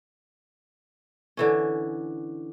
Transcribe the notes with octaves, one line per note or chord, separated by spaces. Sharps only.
D3 E3 C#4